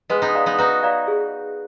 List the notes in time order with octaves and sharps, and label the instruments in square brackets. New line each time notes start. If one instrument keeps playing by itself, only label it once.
[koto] G#3 B3 [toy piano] B4
[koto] B3 D#4
[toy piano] D5 F5 A#5
[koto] B3 D#4
[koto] D#4 F#4 [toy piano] B4
[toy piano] D5 F5 A#5
G#4